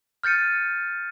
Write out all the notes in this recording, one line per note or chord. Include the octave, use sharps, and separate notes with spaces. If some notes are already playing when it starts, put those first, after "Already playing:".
F6 G6 A6 C#7 D#7